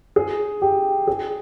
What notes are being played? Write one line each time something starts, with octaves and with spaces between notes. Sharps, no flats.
G#4
G4
G#4